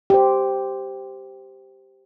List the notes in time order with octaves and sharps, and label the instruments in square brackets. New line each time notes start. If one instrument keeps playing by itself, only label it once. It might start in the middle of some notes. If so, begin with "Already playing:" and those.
[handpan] G4 C5